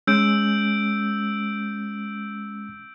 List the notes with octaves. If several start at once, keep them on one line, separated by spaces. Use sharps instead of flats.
G#3 C#4 E6 G6 D7